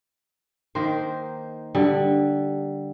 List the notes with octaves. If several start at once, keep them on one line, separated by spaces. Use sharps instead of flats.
D#3 A#3 C5
D3 G3